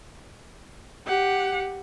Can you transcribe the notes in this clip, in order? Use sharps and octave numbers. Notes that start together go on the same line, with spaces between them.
G4 F#5